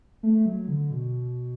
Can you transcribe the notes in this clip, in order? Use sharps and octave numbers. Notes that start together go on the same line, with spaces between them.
A3
F#3
D3
B2